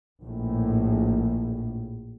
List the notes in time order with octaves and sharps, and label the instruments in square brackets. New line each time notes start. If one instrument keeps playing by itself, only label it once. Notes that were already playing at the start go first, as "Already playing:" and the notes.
[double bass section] A#1 A2